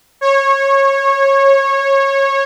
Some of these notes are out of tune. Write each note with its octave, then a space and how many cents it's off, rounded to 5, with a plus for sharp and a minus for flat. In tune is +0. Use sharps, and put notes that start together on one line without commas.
C#5 -20